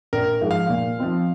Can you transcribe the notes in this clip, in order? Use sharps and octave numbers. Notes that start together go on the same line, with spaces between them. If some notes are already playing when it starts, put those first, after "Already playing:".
A#1 A#4
G#2 F3 G#3
F5
A#2
F3 C4 D#4